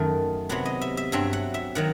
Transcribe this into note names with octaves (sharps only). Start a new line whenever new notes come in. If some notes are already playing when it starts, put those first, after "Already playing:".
Already playing: F#2 D#3 A3
C3 F#3 B3 F#5
D#5
E5
E5
G2 F#3 C4 E5
F#5
E5
D#3 F#3 F#5